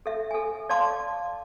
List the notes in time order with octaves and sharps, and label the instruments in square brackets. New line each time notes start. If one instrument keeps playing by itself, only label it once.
[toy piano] A4 E5
A4 G#5
D5 F5 A5 C6 D6